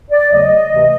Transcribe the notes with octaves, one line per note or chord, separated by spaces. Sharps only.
D5
E2 C#3 F#3 A3 D#5
D2 C3 E3